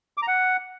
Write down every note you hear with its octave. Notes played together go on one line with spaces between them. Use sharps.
D6
A#5
F#5